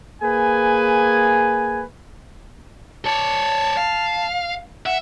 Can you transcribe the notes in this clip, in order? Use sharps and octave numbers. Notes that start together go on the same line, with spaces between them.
A#3 G#4 B4 G#5
C#5 D5 A5
F5
E5 F#5